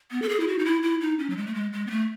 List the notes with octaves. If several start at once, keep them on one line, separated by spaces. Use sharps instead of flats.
B3
A4
G#4
E4
F#4
D#4
E4
E4
D#4
C#4
F#3
G#3
A3
G#3
G#3
B3
A3